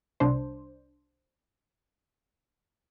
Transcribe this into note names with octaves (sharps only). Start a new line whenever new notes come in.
C2 D4 C5